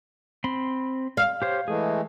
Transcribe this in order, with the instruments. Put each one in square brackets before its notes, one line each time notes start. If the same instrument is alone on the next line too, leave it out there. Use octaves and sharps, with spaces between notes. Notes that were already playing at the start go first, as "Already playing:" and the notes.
[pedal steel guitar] C4 B5 C6
[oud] F5
[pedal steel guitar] G4 C5 C#5
[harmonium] E3 G#3 A3 [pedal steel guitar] G#4